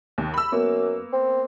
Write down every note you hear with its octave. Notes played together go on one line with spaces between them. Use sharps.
D#2
B5 E6
F#2 A#3 B3
C4